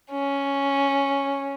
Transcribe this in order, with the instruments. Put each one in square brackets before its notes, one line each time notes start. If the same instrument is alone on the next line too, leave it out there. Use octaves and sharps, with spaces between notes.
[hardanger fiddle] C#4